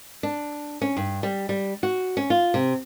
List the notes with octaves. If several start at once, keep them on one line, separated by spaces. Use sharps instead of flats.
D4
C#4
G2
G3
G3
F#4
C#4
F4
C3